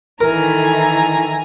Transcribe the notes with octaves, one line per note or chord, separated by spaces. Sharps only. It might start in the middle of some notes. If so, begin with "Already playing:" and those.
D#3 E3 A4 A#4 G#5 A#5